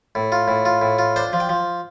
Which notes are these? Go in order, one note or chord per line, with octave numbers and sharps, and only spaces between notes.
A2
F4
A2
F4
A2
F4
D4 C5
F3
G5
F3